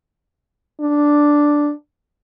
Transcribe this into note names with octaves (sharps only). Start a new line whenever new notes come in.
D4